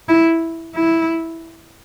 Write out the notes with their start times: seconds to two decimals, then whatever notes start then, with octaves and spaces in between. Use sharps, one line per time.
0.09 E4
0.76 E4